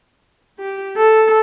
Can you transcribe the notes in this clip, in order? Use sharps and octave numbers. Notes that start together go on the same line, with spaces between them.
G4
A4